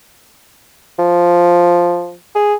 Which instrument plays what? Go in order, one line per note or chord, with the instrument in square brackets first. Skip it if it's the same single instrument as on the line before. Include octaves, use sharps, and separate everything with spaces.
[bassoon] F3
G#4